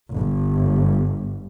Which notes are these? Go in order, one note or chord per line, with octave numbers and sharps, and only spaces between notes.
G1